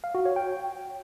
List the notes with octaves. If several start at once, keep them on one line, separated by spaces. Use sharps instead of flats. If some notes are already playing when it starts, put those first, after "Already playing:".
F5
F#4
C#5
G5